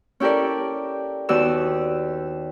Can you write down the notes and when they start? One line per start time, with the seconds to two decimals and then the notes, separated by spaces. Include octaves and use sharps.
0.20 C#4 E4 G4 A4 A#4 D5
1.29 D#2 B3 F#4 D5 E6